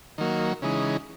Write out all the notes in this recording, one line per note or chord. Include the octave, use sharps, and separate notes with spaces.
D#3 F#3 A#3
C#3 E3 G#3 D#4